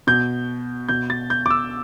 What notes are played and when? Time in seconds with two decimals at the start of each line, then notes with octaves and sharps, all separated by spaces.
0.07 B2 G6
0.89 B2 G6
1.10 A6
1.30 G6
1.46 D6
1.51 E6